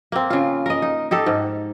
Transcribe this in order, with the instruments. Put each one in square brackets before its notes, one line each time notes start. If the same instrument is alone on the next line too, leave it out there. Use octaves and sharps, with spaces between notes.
[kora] A#3 C4
C#3 F4
A#4 D#5
D#4
D#4 G4 A4
G#2